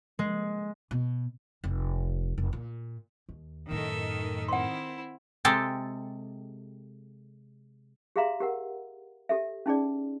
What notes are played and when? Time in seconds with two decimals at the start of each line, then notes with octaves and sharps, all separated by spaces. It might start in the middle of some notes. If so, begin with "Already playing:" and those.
0.19 G#3
0.91 B2
1.64 F1
2.38 F1
2.53 A#2
3.29 D#2
3.71 F#2 A2 D#3 A4 E5
4.48 C4 E4 F#5 C6
5.45 C3 G#3 G4 A4
8.16 G4 G#4 E5 F5 A#5 C6
8.40 G4 A#4 F#5
9.29 G4 A4 E5
9.66 C#4 D#4 G#4 D5